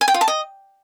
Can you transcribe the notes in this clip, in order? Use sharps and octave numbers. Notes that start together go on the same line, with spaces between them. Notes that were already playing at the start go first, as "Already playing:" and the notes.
G#5
G5
F4
A5
D#5